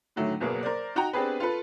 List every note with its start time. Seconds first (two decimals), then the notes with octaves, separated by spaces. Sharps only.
0.16 A2 D3 D#3 F#3 A3
0.40 F#1 B2 F#3 A#3 G#4
0.63 A#4 C5 D5
0.95 D#4 F#4 G5 A#5
1.13 B3 C4 D4 G4 G#4 B4
1.40 F4 A4 B4